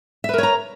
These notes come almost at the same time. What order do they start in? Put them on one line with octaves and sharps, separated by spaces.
E5 B4 A#4 C#5 A#5